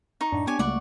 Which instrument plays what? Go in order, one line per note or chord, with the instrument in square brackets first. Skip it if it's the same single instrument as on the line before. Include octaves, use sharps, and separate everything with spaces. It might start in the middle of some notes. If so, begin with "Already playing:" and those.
[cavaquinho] D#4 C#6
[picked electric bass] F#2 A2 [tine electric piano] D4
[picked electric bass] B3 [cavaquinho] G4 C#5 G#5
[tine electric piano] C#2 [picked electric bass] G3 A3 A#3 [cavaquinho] D5 F#5 C#6